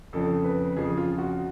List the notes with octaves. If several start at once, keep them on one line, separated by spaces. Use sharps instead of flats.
F2 C#3 F3 A4
B4
F2 C#3 F3 G#4
F4
F#4